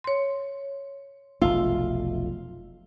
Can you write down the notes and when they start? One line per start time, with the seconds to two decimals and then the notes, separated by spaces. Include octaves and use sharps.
0.04 C#5 C6
1.42 F1 B1 A3 F4 E6